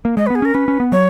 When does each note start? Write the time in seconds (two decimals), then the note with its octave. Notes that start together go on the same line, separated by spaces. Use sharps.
0.05 A#3
0.17 G#3 D#5
0.26 B4
0.30 B3
0.35 G#4
0.42 C#4 A#4
0.54 C#4 B4
0.68 C#4
0.80 B3
0.92 F#3 C#5